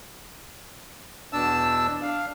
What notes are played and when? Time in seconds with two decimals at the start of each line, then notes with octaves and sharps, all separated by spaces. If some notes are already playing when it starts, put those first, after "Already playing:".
1.33 E2 B2 D4 A5 E6
2.02 D4 F5